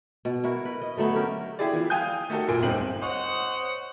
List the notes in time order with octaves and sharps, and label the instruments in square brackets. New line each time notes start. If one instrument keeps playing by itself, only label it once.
[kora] B2
E4 F#4 A#4
B4
D#5
D3 F#3 A3 B3
C#4 G4 A#4
[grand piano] E4 G4 G#4 D5
E3 F3
F5 G5 G#5 D#6 G6
A3 A#3 D#4 F#4 G4 A4
F1 A#2 G#5 D7
D1 G1 C4 D#4 F#7
[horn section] C5 C#5 D#5 F#5